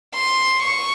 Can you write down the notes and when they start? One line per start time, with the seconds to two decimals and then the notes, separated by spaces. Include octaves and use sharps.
0.15 C6
0.63 C#6